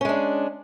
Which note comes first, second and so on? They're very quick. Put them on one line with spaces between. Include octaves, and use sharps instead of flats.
C#4 G#3 D4